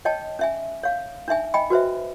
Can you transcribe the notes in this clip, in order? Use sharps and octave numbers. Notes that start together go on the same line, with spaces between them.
C#5 D#5 G5 A5
C#4 E5 G#5
C#5 F5
D4 D#4 E5 G#5
D#5 G5 G#5 B5
F#4 B4 C5 E5